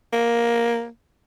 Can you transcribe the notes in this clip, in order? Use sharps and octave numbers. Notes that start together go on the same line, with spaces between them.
A#3